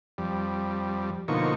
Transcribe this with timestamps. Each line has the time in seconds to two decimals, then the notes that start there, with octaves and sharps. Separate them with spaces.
0.18 F2 G3
1.28 B2 D3 F3 A#3 D#4 C#6